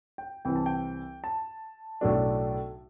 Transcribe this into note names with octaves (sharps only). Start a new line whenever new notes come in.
G5
C2 C3 E3 G5
A5
G5
A5
B1 A2 F#3 A3 D4